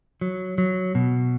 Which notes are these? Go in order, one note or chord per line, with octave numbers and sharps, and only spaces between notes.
F#3
F#3
B2